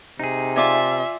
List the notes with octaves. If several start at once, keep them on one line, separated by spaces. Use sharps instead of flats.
C3 D#4 G#4
F4 D5 E5 G#5